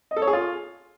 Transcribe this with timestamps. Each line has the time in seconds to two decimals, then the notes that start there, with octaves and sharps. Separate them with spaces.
0.11 D#5
0.16 A4
0.22 C#5
0.27 G#4
0.33 F4